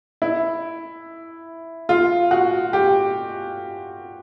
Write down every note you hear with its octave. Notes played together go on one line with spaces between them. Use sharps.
E4
F4
F#4
G4